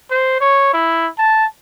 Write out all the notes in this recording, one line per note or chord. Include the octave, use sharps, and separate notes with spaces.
C5
C#5
E4
A5